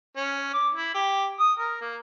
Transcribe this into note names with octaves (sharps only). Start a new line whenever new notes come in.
C#4
D6
E4
G4
D#6
A#4
A#3